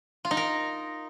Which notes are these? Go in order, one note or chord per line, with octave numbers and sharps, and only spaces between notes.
F4
D#4
A#4